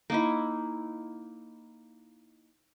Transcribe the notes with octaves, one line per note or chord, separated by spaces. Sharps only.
A#3 D#4 E4